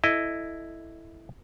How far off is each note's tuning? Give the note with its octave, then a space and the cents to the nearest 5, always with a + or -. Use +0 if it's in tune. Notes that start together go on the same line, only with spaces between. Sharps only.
E4 +0 A4 +0 D#5 -5